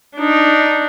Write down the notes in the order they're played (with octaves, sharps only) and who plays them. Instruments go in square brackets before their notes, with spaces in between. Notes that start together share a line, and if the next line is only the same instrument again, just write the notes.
[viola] D4 D#4